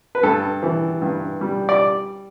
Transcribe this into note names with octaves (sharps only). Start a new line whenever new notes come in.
B4
G2 A4
E3
G2
G3
D5